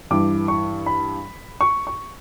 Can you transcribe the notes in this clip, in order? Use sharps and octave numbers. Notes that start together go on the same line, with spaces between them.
G2 E3 D6
C#6
B5
C#6
C#6